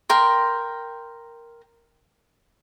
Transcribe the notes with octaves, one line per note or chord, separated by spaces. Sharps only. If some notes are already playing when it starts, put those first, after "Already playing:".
A#4 G5 C6